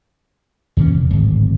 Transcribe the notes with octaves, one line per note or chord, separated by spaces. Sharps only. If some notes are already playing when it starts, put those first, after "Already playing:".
D#2 A#2 E3 C#4
F1
D1 G#1